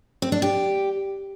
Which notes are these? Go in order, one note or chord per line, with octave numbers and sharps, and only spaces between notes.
C4
D4
G4